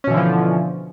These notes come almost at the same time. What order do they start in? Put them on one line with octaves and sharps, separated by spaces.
C#4 B2 E3 D3 F3